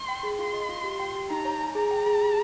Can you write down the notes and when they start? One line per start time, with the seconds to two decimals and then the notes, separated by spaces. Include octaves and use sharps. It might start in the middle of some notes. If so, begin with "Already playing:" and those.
Already playing: C6
0.09 G5
0.23 G#4
0.39 F4 C6
0.54 D#5
0.69 F4
0.84 G4
1.00 G5
1.15 G4
1.30 D#4 A#5
1.45 C#5
1.60 G#5
1.75 G#4 A#5
1.91 G5
2.06 G#4
2.21 G4